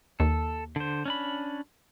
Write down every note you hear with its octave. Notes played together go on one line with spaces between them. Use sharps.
D#2 A4
D3 C5
C#4 D4 B5